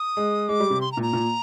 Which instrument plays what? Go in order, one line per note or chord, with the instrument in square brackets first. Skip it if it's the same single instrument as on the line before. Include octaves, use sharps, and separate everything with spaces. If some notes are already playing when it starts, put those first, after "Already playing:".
Already playing: [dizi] D#6
[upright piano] G#3
[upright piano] G#3 [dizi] D6
[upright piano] G3
C3
[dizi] C6
A#5
[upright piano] A#2
[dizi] A#5
[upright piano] A#2